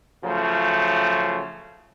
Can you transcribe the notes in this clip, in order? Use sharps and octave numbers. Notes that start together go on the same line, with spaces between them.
C#3 F3 F#3 A3